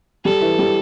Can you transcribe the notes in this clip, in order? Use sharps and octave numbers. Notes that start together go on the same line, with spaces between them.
G3 A4
E3
G3